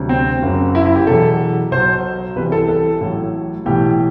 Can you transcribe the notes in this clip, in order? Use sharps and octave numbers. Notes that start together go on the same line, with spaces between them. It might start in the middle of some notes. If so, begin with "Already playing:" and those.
Already playing: D2 C3 F#3
C4
F#1 F#2 F#3
E4
E4
G4
E2 B2 F#3 A4
B1 B2 F#3 C5
C2 C3 E3 B4
A4
A4
A1 A2 F#3
B1 A2 E3 G4